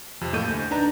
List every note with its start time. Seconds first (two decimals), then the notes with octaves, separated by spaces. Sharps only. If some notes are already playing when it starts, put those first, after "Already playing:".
0.21 F2 C3
0.33 A2 A#3 A4 D#5 G6 D#7
0.48 D2
0.71 D4 D#4 B4 A#5